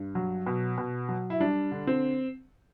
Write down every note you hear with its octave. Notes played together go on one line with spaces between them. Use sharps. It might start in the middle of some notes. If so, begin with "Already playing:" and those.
Already playing: G2
F#3
B2
B2
F#3
E4
G3 D4
D3
C4